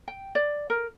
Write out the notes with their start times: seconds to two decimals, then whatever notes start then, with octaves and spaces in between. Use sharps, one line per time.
0.08 G5
0.35 D5
0.70 A#4